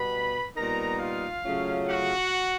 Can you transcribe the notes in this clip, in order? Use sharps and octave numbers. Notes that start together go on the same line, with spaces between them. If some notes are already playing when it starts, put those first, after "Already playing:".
Already playing: B2 G3 B3 B4 B5
A#2 G3 B3 D#4 A#4 A#5
F4 F5
C#3 F#3 A3 C#4 F4
F#4 F#5